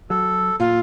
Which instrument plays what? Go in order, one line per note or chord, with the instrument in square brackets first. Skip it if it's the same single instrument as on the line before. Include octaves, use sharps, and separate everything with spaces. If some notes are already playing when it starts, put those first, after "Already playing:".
[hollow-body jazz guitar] F#3 [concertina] A4
[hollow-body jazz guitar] A#2 [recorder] F4